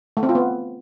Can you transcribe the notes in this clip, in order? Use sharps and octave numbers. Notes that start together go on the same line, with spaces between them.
A3
C4
F4
B3